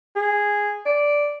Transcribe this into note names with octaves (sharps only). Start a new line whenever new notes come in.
G#4
D5